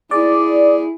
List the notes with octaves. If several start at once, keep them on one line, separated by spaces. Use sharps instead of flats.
E4 G#4 D5